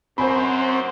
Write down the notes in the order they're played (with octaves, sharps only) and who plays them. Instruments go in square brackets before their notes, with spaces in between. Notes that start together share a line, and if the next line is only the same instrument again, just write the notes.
[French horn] F#2 [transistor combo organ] C4 [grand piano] C5 G#5 B5